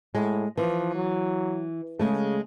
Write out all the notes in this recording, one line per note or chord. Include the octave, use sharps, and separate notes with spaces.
A2 G#3
E3 F3
F#3
C#3 G#3 A3